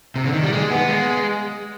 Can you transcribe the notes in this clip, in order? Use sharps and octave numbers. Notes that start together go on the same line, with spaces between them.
C3
D3
D#3
G3
G#3
B3
G#3